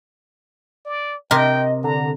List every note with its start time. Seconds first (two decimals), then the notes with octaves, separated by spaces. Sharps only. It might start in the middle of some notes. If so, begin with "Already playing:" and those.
0.86 D5
1.31 C3 A#4 D#5 G5
1.84 D3 A#5